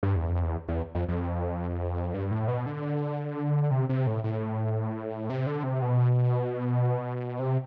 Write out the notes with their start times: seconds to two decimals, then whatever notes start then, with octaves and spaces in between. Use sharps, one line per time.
0.03 G2
0.16 E2
0.29 F2
0.43 E2
0.68 E2
0.95 F2
1.08 F2
2.14 G2
2.31 A2
2.48 B2
2.66 D3
3.71 C3
3.89 C3
4.07 A2
4.24 A2
5.30 C3
5.46 D3
5.63 C3
5.82 B2
7.39 C3